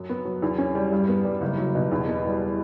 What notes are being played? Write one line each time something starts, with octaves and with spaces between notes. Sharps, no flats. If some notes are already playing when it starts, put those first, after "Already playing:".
Already playing: F#2 F#3
B3
F#3
E2
C#4
G3
G2
B3
G3
F#1
F#3
B2
E2
B3
G3